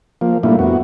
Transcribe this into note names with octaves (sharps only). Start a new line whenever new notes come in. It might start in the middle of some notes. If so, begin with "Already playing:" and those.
F3 A#3
A#2 G3 A3 A#3 D4 E4
F2 B3 F#4